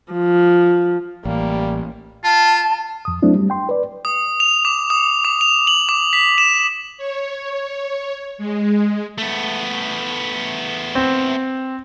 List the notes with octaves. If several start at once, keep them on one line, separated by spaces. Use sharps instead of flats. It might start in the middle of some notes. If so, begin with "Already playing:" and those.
F3
A1 G3 A#3
F4 A5
F2 D#6
F#3 A3 C4 D4 E4
G3
G5 C6
B4 D5
D#6
F7
D6
D#6
D6
F7
F#7
D6
B6
E7
C#5
G#3
A3 B3
C4